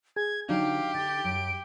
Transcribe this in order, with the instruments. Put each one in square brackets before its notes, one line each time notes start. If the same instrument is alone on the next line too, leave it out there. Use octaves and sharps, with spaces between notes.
[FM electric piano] G#4 [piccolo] G#6
[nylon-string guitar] D3 F#3 [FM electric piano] D4 D#4 [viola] G4 [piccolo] F5
[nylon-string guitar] D3 [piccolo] A6
[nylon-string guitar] F#2 [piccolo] D7